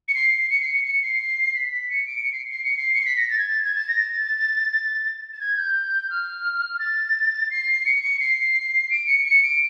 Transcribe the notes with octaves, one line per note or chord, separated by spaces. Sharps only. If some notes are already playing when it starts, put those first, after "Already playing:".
C#7
C7
C7
C#7
C7
C#7
C#7
C7
B6
B6
C#7
D7
C#7
C7
C7
C#7
C7
C#7
C7
B6
A#6
A6
G#6
A6
G#6
A6
A#6
A6
A6
G#6
G6
F6
A6
C7
C#7
C#7
C7
D7
C#7
C#7
D7